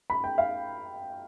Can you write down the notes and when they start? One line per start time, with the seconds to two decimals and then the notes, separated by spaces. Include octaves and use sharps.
0.10 B5
0.24 G5
0.38 F5